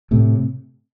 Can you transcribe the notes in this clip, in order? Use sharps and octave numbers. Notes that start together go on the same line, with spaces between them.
A2 C3